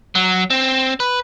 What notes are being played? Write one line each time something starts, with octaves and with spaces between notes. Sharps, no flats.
F#3
C4
B4